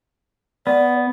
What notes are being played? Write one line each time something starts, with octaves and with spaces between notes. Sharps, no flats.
B3 D5